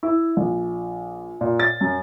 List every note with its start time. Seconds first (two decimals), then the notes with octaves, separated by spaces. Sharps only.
0.03 E4
0.37 A#1
1.41 A#2
1.60 A6
1.81 F#2